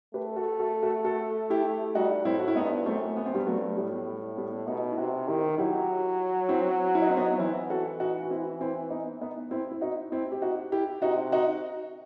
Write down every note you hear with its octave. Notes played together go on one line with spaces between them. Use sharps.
A3 G4 B4
F#4 A4
F#4 A4
F#4 A4
F#4 A4
E4 G4
G3 D#4 F#4
A2 C4 E4
F#4
E4
G2 B3 D#4
F#2 A3 C4
B3
C4
G2 G3 B3
F#3 A3
A2 G3 B3
G3
G3 B3
B2 B3 D#4
E4
C3 D#4 F#4
D#3 E4 G4
F#3 E4 G4
C4 E4
E4
D#4
C4
B3 D#4
E3 C4 E4
F#4 A4
D#4 F#4
F#4
C4 E4
C4 E4
B3 D#4
B3 D#4
C4 E4
E4
D#4 F#4
C4 E4
G4
D#4 F#4
E4 G4
C3 D#4 F#4
D#4 F#4